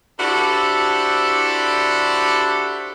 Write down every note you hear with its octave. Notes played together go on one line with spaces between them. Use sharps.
D4 E4 F#4 G4 A4 C5